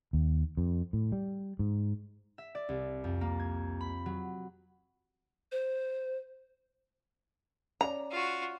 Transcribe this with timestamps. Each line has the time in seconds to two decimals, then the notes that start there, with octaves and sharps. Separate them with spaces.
0.13 D#2
0.57 F2
0.93 A2
1.12 G3
1.59 G#2
2.38 E5
2.55 D5
2.69 C2
3.04 F2
3.21 A#3
3.40 G#6
3.81 B5
4.06 F#3
5.52 C5
7.81 C#4 D5 A#5
8.10 F4 F#4